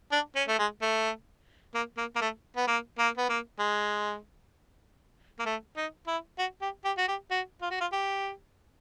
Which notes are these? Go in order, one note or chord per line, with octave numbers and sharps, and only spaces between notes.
D4
C#4
A3
G#3
A3
A#3
A#3
A#3
A3
B3
A#3
A#3
B3
A#3
G#3
A#3
A3
D#4
E4
F#4
G4
G4
F#4
G4
F#4
F4
F#4
F4
G4